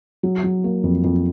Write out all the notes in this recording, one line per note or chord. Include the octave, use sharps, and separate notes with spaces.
F#3
F#3
A#3
F2
F2